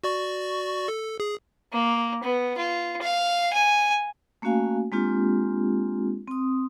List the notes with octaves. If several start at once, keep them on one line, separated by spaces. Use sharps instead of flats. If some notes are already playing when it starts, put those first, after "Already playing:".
F#4 D5 C#6
A4
G#4
A#3
B3
F4
F5
G#5
A3 A#3 C#4 F#4 F5 G#5
G#3 A#3 C4 D4 F4 G4
C4 D#6